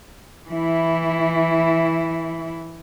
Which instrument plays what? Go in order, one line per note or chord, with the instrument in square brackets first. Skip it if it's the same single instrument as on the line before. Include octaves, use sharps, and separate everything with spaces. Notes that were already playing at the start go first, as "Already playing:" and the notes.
[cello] E3 E4